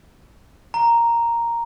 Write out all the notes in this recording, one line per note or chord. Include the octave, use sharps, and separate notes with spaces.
A#5